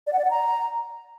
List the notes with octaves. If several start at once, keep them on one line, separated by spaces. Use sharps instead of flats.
D5
F#5
D5
F#5
A#5